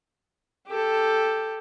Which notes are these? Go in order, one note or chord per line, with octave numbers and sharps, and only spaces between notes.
G4 A4